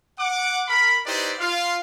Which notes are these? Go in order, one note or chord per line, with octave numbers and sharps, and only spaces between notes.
F#5 D6
A#4 B5
D#4 E4 G4 B4 C5 D5
F4 F5